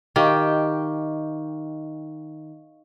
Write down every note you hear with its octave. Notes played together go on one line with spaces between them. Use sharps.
D#3 G4 D#5 F5 C#6